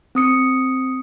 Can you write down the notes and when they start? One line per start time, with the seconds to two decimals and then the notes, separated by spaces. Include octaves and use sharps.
0.15 C4 D#6 C#7